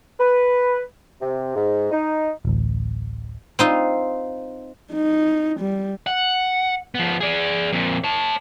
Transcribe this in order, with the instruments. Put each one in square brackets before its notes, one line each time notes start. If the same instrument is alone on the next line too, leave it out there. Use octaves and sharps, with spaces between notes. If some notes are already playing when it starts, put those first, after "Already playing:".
[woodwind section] B4
C3
G#2
D#4
[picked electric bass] D1 A1
[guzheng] C4 D#4 F4
[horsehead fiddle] D#4
G3
[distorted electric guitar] F#5
F3 B3
G#4 D5
F2 A#2
C#5 A5